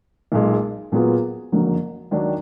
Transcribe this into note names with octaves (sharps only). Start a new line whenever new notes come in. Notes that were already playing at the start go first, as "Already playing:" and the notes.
B1 A#2 G#3
A#2 F#3 B3 F4 G#4
F#1 F2 D3 F#3 A#3
D#2 D#3 F#3 D4